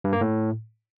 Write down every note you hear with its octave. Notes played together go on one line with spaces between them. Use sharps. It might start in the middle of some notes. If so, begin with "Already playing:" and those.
G2
A#3
A2